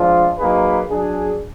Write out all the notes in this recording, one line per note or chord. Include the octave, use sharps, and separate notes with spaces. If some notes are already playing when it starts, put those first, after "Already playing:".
Already playing: F3 G#3 D4 F4
F#3 A#3 D#4 G#4 B4
F#3 D4 G#4